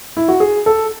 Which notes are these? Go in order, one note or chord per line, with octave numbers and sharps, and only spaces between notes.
E4
F#4
G#4
A4